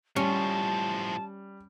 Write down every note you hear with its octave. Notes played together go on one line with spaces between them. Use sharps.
A2 F3 G3 C#4 A5